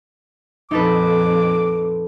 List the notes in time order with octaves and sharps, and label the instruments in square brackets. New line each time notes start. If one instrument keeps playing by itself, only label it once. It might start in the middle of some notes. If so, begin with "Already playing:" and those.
[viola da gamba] F2 A#2 [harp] D#4 A4 B4 [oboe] D6